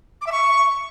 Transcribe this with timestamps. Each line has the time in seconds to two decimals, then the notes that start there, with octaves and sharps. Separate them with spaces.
0.21 D6
0.27 E5
0.32 C#6